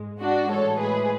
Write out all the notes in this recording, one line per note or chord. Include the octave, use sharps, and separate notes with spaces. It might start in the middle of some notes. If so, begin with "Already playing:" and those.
Already playing: G#2 G#3
D4 F#4
A2 E3 G#3 A4 C#5
G#4 B4